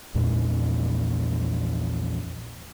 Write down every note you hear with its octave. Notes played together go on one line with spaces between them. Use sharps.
A#1 E2 A#2 G#3